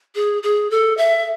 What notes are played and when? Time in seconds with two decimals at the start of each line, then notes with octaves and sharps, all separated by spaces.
0.15 G#4
0.43 G#4
0.71 A4
0.97 E5